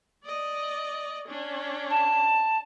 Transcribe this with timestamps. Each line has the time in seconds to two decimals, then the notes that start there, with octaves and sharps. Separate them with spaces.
0.24 D5 D#5
1.28 C#4 D4
1.89 A5